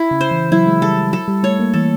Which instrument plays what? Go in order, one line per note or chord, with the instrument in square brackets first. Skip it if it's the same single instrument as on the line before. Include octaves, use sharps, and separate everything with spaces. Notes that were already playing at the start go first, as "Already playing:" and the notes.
Already playing: [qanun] E4
[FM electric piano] C#3
[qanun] C5
[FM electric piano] E3
[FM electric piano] F#3 [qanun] E4
[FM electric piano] G#3
[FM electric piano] G3 [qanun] A4
[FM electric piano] F#3 [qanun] A4
[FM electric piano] G3
[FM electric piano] A3 [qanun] C#5
[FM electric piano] A#3
[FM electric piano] E3 [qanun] A4